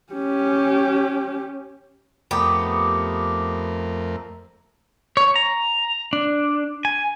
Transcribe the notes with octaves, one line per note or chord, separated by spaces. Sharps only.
C#4 G4
F2 A3 B3 G4 A#4
C#5
A#5
D4
G#5